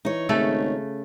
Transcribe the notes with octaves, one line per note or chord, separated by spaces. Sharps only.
E3 D#4 C#5
G#1 C#3 A3 A4